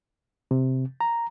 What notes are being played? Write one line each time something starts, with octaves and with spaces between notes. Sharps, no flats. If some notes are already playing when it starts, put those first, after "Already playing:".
C3
A#5